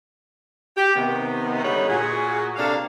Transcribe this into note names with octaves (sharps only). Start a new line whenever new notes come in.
G4
C3 D#3 B3
D3 G3 G#3 B3 D#4 C#5
A#2 F#4 G#4
C3 A#3 D4 A4 F5